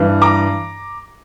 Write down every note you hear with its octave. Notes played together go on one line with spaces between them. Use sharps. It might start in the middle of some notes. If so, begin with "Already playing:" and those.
Already playing: G2 E3
A#5 D6